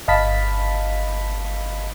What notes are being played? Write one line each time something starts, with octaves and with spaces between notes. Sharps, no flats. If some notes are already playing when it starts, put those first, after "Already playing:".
G1 D#5 F5 A5 B5 B6